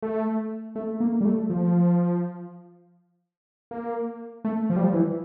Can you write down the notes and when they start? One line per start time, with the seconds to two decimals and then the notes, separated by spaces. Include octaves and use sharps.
0.02 A3
0.76 A3
1.00 A#3
1.21 G3
1.25 A3
1.50 F3
3.71 A#3
4.45 A3
4.70 F3
4.76 G3
4.84 F3
4.94 E3